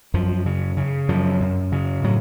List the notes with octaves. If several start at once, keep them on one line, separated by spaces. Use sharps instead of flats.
F#2 F3
C#3
C#3
F#2 F3
F#2
C#3
A2 F#3